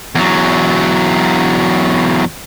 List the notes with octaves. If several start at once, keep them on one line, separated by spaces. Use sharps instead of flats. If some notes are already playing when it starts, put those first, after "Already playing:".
E2 F#3